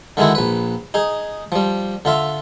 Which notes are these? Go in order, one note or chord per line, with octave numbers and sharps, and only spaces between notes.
D3 D#3 G#3 E4 F#4
A#1 B4
D#4 G#4
F3 G3
D3 F4 E5